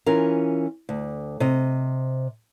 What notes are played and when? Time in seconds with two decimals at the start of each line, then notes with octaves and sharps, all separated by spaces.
0.06 E3 C#4 F4 A#4
0.89 D2
1.40 C3 D#5